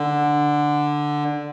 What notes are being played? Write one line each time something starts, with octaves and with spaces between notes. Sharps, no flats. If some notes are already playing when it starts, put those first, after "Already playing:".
Already playing: D3